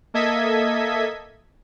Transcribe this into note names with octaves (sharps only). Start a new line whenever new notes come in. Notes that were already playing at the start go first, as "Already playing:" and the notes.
A#3 A4 D#5 E5 G#6 B6